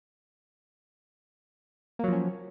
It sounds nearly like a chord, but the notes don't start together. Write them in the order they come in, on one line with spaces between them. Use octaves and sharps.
A#3 F#3 F3 C#4